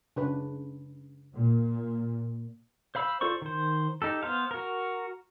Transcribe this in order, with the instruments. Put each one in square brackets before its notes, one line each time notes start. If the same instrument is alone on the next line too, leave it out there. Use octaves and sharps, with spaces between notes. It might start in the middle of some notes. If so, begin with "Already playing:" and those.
[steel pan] C#3 D4 B4
[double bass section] A#2
[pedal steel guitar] C5 F5 B5 E6
F4 A4 C5 D5 C#6
D#3 C5
D#4 G4 A4
B3 C5 F5
F#4 A#4